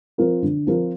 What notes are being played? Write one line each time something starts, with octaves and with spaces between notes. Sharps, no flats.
F3 C4 F4 A#4
D3
F3 C4 F4 A#4